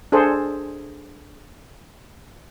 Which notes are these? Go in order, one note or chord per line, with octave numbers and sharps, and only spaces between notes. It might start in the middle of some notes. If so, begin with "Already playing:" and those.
D4 G#4 A4 C5